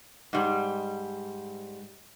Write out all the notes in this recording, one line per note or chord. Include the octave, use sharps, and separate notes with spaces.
G#2 G3